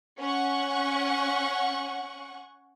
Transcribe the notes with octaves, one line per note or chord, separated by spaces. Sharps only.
C#4 F#5 C#6